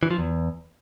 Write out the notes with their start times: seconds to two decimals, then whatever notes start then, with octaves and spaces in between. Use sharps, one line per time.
0.03 E3
0.11 F3
0.18 E2